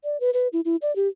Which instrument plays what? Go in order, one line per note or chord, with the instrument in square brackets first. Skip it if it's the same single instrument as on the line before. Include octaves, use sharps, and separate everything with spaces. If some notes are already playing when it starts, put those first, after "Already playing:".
[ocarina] D5
B4
B4
E4
E4
D5
G4